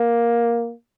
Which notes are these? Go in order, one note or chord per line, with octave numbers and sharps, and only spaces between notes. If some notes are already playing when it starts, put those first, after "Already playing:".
Already playing: A#3